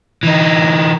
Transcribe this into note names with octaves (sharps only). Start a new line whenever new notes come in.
E3 D#4